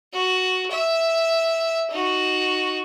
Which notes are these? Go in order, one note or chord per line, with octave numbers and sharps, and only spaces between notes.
F#4
E5
D#4 F#4